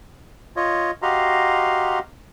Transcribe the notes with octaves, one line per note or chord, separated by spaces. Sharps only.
F4 C#5 D#5
F#4 G4 D#5 F5 A#5 C6